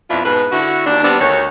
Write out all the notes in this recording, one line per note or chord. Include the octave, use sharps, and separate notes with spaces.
F2 B2 D4 E4 F4
G#2 B2 B4
D3 E4 F#4
D#2 D4
G3 B3 C4 D4
D2 D#3 F#4 C#5